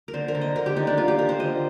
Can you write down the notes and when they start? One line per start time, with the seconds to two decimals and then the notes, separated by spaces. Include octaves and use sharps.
0.08 A#4
0.13 D3 C5
0.28 A#4
0.35 D3
0.41 D#5
0.56 D3 A#4
0.66 G4
0.76 D3 D#4
0.87 D4
0.97 D3 F4
1.08 G4
1.18 D3 A#4
1.29 C5
1.39 D3 D#5